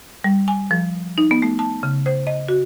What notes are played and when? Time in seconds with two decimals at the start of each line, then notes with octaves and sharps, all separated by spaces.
0.24 G3
0.48 G#5
0.71 F3
1.18 D#4
1.31 B3
1.42 A3
1.59 A5
1.83 C#3
2.06 C5
2.27 D#5
2.48 F#4